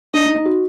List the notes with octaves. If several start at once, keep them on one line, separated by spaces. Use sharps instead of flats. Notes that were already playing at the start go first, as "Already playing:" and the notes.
D4 D#5
D#4
D#4
F#4